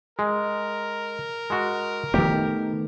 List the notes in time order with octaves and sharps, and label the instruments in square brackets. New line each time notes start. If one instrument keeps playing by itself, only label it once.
[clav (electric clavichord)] G#3 [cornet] A#4
[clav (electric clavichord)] G#3 F#4
[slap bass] D#3 A3 B3 [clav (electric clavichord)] G4